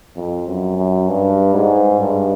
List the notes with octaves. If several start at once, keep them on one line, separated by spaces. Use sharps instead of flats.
F2
F#2
F#2
G2
G#2
G2